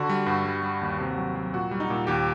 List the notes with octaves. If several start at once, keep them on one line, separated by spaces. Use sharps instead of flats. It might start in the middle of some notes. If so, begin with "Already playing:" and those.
Already playing: D3 F#4
G3
G2
G3
G3
D#2
C3
F#3
F#3
A#2 F#4
G3
D#4
A#2
D#2 G4